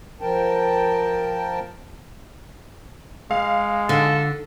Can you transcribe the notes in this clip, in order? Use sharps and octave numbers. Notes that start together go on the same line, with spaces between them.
F3 A#4 G5 A5
G#3 F5
D3 F4 A4